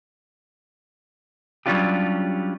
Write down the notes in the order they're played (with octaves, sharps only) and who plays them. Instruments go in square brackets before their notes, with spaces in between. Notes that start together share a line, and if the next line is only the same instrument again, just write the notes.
[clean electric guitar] F#3 G3 C#4 D4 F4 G4